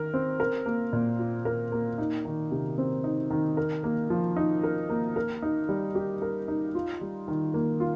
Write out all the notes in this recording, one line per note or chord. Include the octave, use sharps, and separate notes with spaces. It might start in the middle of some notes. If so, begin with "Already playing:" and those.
Already playing: D#3 A#4
C4
A#4
A#3
A#2
F4
A#4
A#3
D#4
D#3
C3
C4
D#4
D#3
A#4
A#3
F3
D#4
A#4
A#3
A#4
D#4
G3
G4
A#4
D#4
F4
G3
D#3
A#3
F4